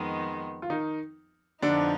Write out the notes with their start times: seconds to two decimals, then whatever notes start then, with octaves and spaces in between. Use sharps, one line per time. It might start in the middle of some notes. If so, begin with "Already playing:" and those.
Already playing: F2 D#3 G#3 B3
0.62 F4
0.70 D#3 D#4
1.62 F2 D3 F3 B3 D4 D#4